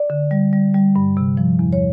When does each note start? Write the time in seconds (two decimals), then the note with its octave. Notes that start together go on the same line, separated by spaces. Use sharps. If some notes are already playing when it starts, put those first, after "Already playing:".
Already playing: D5
0.10 D3
0.31 G3
0.53 G3
0.74 G3
0.96 G2
1.17 C3
1.37 F3
1.59 E2
1.73 C#5